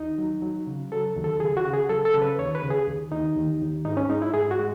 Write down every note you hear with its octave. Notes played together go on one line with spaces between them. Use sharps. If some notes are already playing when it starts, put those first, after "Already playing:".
Already playing: D#2 D#4
F#3
F#3
C#3
F#3 A4
D#2
A4
C#3 G#4
F#4
C#3
G#4
F#3 A4
A4
C#3
B4
D#2 C#5
B4
C#3
G#4
D#2
D#2 D#4
D#2
D#2
G#2 D#4
C#4
G#3 D#4
E4
G#2 G#4
F#4
G#3